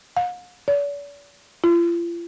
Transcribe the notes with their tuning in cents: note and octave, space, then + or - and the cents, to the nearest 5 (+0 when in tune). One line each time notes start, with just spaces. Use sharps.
F5 +45
D5 -45
F4 -40